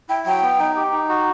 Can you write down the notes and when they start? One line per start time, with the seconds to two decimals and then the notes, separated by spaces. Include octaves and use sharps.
0.09 E4 G5
0.26 F#3 G5
0.42 B3
0.59 D#4
0.76 G4
0.92 D#4
1.09 F#4